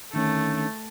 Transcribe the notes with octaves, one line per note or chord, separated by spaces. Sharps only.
D3 D#3 A3 C#4